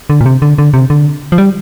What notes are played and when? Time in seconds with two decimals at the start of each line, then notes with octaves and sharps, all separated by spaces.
0.10 D3
0.21 A#2
0.26 C3
0.42 D3
0.58 D3
0.74 C3
0.90 D3
1.32 F3
1.38 G3